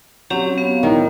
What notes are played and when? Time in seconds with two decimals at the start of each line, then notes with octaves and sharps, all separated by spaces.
0.30 F#3 C4 C#4 G4
0.58 B3 F5
0.83 A2 D#3